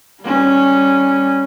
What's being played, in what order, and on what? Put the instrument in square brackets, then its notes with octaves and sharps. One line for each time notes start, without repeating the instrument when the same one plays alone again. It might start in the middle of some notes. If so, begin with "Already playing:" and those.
[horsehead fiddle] G3 C#4